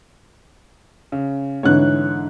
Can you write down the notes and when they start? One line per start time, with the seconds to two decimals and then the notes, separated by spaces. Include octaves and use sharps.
1.12 C#3
1.63 G#2 D3 E3 C#5 F#6